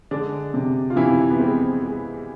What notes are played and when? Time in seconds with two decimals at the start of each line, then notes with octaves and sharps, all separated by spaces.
0.11 D3 G#3 D4
0.54 C3
0.90 F4
0.96 C3 E3 E4
1.30 B3
1.39 G#3 C4
1.82 G#3